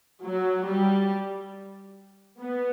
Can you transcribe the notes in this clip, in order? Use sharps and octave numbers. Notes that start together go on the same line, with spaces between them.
F#3
G3
B3